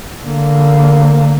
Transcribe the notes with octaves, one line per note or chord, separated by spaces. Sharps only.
D3 A#3